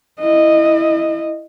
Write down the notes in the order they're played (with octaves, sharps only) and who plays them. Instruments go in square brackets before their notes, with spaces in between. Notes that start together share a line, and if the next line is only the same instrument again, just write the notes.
[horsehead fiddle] E4 D#5